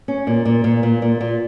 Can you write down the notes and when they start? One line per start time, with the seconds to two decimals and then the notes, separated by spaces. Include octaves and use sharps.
0.08 C#4
0.27 A#2
0.45 A#2
0.64 A#2
0.83 A#2
1.02 A#2
1.21 A#2